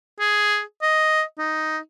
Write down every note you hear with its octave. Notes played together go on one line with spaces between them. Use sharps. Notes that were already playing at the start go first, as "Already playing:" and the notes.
G#4
D#5
D#4